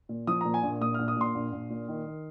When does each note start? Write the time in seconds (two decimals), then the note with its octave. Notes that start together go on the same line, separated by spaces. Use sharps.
0.09 A#2
0.27 F3 D#6
0.41 A#2 A#5
0.54 G#5
0.63 A#1
0.81 A#2 D#6
0.94 A#1 F6
1.08 D#6
1.17 A#2 C6
1.35 A#1
1.53 A#1
1.70 A#2
1.88 D#3
2.06 D#3